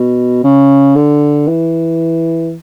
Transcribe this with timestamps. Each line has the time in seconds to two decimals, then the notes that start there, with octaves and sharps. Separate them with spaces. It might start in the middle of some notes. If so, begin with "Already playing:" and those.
Already playing: B2
0.44 C#3
0.96 D3
1.47 E3